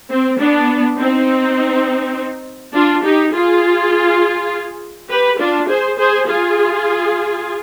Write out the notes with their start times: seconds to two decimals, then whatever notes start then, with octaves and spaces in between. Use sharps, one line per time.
0.09 C4
0.39 B3 D4
0.97 C4 D#4
2.74 D4 F4
3.03 D#4 G4
3.33 F4 G#4
5.09 G4 B4
5.39 D4 F4
5.68 G#4 C5
5.98 G#4 C5
6.27 F4 G#4